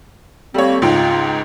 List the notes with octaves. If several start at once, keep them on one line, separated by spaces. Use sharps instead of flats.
G3 A3 A#3 C4 C#5
C#2 G#2 F4 G5